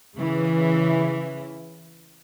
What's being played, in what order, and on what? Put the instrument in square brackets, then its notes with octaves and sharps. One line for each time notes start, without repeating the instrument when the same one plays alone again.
[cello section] C#3 E3